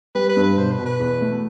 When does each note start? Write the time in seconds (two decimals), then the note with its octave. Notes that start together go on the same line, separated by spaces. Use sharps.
0.15 G3 B4
0.29 B4
0.37 G2
0.43 B4
0.57 B2 C5
0.72 B4
0.78 B2
0.86 B4
1.00 E2
1.21 A3